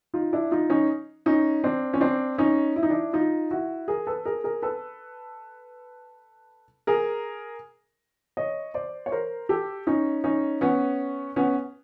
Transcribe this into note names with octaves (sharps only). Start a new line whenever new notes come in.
D#4 F4
D4 E4
D#4 F4
C#4 D#4
C#4 D#4
C4 D4
C#4
C4 D4
C#4 D#4
E4
D#4
D4 E4
D#4 F4
E4 F#4
G#4 A#4
A4 B4
G#4 A#4
G#4 A#4
A4 B4
G#4 A#4
C#5 D#5
C5 D5
C#5
A#4 C5
G4 A4
C#4 D#4
C#4 D#4
B3 C#4
B3 C#4